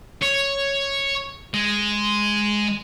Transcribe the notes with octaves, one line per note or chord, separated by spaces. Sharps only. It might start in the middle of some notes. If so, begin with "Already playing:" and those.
C#5
G#3